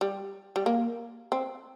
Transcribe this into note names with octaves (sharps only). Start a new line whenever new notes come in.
G3
G3
A#3
C4